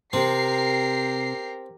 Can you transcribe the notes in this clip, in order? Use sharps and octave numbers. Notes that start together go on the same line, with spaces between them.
C3 C4 G4 A#4 C7